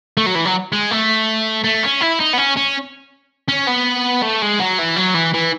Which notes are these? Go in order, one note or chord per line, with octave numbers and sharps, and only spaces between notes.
A3
F#3
E3
F#3
G#3
A3
A3
C#4
E4
D#4
B3
C#4
C#4
C#4
B3
A3
G#3
F#3
E3
F#3
E3
E3